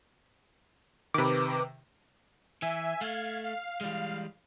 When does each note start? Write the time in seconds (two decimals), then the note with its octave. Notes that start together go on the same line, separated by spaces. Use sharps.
1.14 C3 D#3 B4 D6
2.62 E3 E5 G#5
3.01 A3 F5 G#6
3.44 F5
3.81 E3 G3 G#3